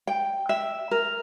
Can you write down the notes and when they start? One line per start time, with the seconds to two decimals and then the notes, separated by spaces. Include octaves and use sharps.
0.07 G5
0.49 E5
0.91 A#4